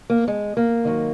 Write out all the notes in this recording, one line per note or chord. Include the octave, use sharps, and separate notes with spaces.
A#3
G#3
A#3
G#2 D#3 F#3